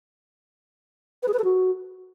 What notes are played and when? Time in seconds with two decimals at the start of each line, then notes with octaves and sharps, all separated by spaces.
1.23 B4
1.28 G#4
1.33 B4
1.39 A4
1.44 F#4